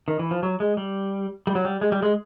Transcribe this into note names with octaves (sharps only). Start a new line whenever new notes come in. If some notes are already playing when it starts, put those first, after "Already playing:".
D#3
E3
F3
F#3
G#3
G3
G3
F#3
G3
G#3
G3
G#3